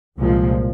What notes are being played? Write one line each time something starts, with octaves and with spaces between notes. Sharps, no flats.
C2 A#2 F3 G#3